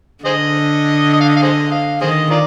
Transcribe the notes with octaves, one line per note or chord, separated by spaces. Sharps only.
D3 G#4 C5 D#5
D#5
F5
D#5
F5
G#4 C5 D#5
F5
D#3 G#4 C5 D#5
F4 A#4 D5